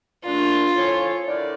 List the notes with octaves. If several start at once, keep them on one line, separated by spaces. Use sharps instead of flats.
A#2 A3 D4 F4
F3 C#4 E4 A4 C#5
D3 A3 E4 A#4 D5